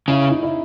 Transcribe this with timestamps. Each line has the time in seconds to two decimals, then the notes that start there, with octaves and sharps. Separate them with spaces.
0.08 C#3 E4
0.31 D#4
0.42 E4